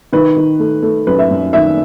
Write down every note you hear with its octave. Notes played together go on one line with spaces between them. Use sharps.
D#3 B4
D#3
A3
A3
F#2 B4
E5
F#2
D#3 E5